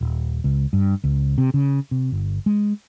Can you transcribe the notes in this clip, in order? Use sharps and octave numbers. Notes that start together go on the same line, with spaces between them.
D#1
C#2
G2
C#2
C3
C#3
C3
G1
G#3